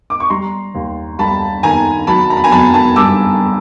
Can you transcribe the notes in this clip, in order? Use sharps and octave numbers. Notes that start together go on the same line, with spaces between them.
D6
C#6
G3 A#5 C6
D#2
G3 A5 B5
D#3 G#5 A#5
F#3 A5 B5
A#5
B5
G#5 A#5
F#3 A5 B5
A5 B5
G2 D6 E6